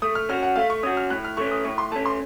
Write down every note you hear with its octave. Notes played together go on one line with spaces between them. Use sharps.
A3 D#6
F6
C#4 F#4 F6
F#5
A3 F5
C#6
C#4 F#4 D#6
F6
A2 F#6
F6
A3 C#4 C#6
D#6
A2 C#6
C6
A3 C#4 A5
C6